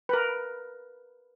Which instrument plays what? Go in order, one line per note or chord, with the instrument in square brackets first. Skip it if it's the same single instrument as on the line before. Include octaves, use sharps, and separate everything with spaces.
[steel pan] A#4 B4